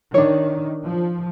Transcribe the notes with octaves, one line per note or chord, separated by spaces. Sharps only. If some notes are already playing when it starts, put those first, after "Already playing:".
D#3 D4 C#5
F3